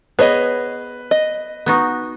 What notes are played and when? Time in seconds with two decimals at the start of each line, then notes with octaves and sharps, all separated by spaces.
0.19 B3 G#4 B4 C#5 D#5
1.11 D#5
1.66 B3 D#4 F#4